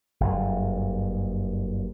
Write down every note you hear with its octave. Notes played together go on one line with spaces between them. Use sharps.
F#1 G2